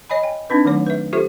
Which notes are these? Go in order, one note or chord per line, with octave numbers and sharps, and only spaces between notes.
C#5 D#5 G#5 B5
G5 G#5
C4 D4 D#4 B4
D#3 F#3 A3 C#5
B4 E5
F4 G4 A4 C5 E5